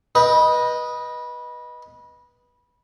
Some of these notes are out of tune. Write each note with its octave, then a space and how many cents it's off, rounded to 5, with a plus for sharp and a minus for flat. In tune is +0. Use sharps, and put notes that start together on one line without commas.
B4 -20 D#5 +0 G5 +5